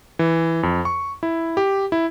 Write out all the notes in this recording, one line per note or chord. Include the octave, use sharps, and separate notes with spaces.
E3
F2
C#6
E4
G4
E4